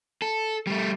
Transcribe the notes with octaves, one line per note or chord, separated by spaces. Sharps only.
A4
G3 A3